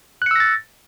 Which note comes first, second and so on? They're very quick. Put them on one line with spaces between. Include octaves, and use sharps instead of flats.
F#6 C#7 E6 A#6 A6